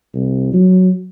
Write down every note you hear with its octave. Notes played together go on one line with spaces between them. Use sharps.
C2
F#3